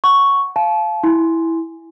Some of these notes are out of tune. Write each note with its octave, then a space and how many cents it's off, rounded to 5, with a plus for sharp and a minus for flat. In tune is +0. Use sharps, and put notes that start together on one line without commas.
F#5 +0 C#6 +0
F5 -10 A5 -30
E4 -5 G#5 +0 C6 +0